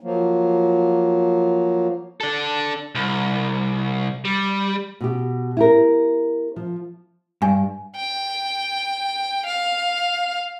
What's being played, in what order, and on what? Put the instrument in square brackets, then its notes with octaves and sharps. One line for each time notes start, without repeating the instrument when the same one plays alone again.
[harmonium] F3 F#3 A#3
[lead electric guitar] D4 A4
C2
G3
[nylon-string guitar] B2 G4
E4 G4 A#4
F3
[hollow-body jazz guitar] G2 [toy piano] G#5
[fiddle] G5
F5